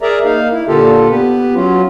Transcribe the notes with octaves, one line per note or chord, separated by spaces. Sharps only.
G#4 A#4 D5 E5 A#5
A#3 D#4 F5
E4
A#2 D3 A#3 F4 G4 A4
B3 G4 B4
F#3 C#4 F4